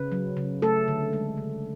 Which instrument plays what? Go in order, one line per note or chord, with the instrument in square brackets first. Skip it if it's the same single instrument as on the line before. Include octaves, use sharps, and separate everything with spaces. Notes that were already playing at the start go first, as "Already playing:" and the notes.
Already playing: [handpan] C#3 B4
F#3
C#3
A3 A4
D3
G#3
C#3